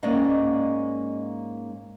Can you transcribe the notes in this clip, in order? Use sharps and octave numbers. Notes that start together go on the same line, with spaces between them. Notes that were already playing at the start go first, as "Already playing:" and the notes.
G#2 G#3 A#3 C#4 D5 D#5